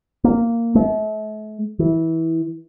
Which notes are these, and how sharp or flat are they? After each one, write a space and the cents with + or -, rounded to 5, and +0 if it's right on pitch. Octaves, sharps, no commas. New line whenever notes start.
A#3 -10
A3 -40
E3 -20